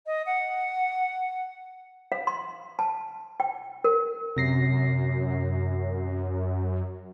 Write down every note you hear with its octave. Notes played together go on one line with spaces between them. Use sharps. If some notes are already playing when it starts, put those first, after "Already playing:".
D#5
F#5
F5
C6
A5
G5
A#4
F#2 C3 A#6 C7